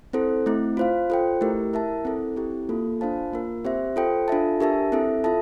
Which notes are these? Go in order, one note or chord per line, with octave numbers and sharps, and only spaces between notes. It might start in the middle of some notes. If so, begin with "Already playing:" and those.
C4 E4 A4 C5
A3 C4 E4
F4 C5 F5
F4 A4 C5 G5
A3 E4 G4 A#4
E4 A#4 E5 A5
C4 E4 A4
C4 E4 G4
A#3 F4 A4
D4 F4 C5 F5 A5
A#3 F4 A#4
C4 G4 C5 E5
F4 A4 C5 G5
D4 F4 A4 E5 A5
D4 G4 A#4 E5 A5
C4 E4 A4 E5
F4 A4 E5 A5